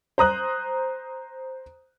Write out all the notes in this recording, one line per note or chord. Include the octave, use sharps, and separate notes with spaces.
C5 A#5 D#6 F#6